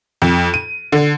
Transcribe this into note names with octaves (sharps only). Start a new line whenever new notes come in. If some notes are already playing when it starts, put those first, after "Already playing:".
F2
D#7
D3